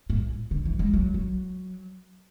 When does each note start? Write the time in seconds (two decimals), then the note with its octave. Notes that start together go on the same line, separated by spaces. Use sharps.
0.10 A2
0.51 D3
0.65 E3
0.79 G#3
0.94 F#3
1.14 F#3